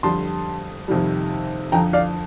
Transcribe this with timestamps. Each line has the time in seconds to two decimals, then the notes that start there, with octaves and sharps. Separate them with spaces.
0.03 F2 D3 G3 A5 C6
0.88 F2 C3 D#3 G3
1.72 F2 D3 F3 G5 A#5
1.93 D5 F5